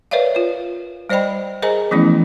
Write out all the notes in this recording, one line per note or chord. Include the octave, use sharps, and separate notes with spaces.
A#4 B4 C#5 D5 E5 F5
F4 B4
G3 C5 D5 D#5 G5 B5
G#4 A#4 C5 D#5 G#5 A#5
E3 F3 A3 B3 C#4 E4